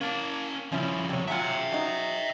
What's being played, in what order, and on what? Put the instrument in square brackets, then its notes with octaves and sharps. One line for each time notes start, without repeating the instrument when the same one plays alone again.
[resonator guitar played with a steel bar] A#3 [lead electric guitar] C#4 A5
[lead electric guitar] D#2 F3 [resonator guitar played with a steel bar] C#3 C#4 E4
[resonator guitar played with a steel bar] C3 C#5
[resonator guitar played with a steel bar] F#3 G#3 F4 [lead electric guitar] E5 G5
[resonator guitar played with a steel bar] F#3 D#4